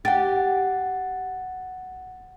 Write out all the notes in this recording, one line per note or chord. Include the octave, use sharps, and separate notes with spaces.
G4 F#5 A6